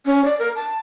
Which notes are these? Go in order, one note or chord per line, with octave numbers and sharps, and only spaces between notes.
C#4
D5
A#4
A5